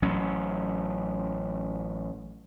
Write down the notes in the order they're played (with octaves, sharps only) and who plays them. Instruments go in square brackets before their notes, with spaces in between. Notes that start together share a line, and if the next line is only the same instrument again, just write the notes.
[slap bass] A1 F#3 C#4